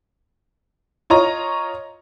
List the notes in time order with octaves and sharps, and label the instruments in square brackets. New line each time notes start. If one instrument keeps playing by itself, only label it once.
[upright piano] F4 C#5 D#5 A#5